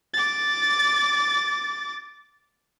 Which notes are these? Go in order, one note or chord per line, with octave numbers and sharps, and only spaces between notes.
D6 A6